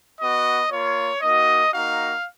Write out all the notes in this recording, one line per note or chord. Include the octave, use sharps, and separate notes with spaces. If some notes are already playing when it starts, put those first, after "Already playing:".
B3 F#4 D#5
A#3 F4 C#5
A#3 D#4 F#4 D#5
A#3 D#4 F#4 F5